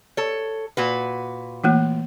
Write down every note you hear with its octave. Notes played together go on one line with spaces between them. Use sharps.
A4 C#5
A#2 F#4 B4
E3 A3 A#3